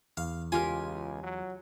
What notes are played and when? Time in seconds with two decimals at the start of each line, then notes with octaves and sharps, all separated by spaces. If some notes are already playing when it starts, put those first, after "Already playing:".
0.17 E2 F5
0.52 C#2 F4 G4 A#4 G#5
1.23 F#3